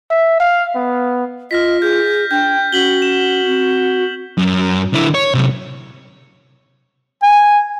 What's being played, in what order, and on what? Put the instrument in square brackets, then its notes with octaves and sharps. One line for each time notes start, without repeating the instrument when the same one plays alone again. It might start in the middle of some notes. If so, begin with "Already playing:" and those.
[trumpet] E5
F5
B3
[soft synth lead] F4 [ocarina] D#5 [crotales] F6 A#6 B6
[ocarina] G#4 [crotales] G6
[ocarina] D4 [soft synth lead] G5 [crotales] G6
[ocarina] C#4 [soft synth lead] F#4 [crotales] B6 F#7 G7
[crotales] E7
[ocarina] C4
[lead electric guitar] F#2
D3 E4
C#5
C3 F#3
[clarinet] G#5